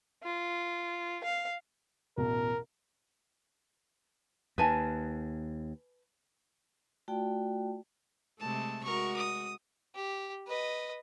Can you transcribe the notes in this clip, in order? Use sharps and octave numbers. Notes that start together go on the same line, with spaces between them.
F4
F5
A1 E2 B2 A#4
D#2 B4 G#5 A5
A3 F4 F#4 D5 G5 A5
C3 G#3 A3 A5
G#3 F#4 A#4 C#6
D#6
G4
B4 D#5